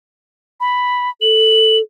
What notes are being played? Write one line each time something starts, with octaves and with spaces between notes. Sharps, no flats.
B5
A4 F#7